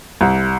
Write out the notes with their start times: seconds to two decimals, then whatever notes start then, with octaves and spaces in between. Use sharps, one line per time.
0.21 C2